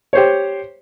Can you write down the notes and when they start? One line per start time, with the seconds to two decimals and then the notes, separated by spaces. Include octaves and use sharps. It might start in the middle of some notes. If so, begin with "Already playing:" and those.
0.13 G4 C5 C#5